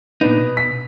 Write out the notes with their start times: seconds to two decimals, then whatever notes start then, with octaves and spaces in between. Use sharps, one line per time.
0.21 A#2 B3 D4 D#4
0.39 B2
0.57 B6